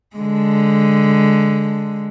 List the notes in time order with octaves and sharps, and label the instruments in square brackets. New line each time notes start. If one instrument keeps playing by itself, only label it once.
[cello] D3 G#3